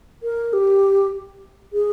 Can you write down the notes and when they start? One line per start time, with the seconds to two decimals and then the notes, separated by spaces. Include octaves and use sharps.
0.23 A#4
0.53 G4
1.73 G#4